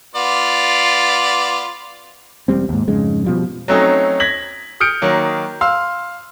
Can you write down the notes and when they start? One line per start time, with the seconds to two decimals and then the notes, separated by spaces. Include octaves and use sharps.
0.15 B3 F4 D5
2.48 E1 G#2 G3 C4
2.69 D#2 G#2
2.88 F2 G#2 C#3 G#3
3.24 B2 F3 G3
3.68 F#3 A3 C4 C#4 D#4
4.20 G#6 A#6 B6 F#7
4.80 D#6 F6 G6 C#7 D7
5.02 D#3 F#3 A#3
5.61 F5 C6 E6